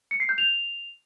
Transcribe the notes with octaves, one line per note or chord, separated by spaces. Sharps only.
C#7
C7
G6
F7